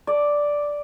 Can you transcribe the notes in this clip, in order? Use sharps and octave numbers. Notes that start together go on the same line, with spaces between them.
D5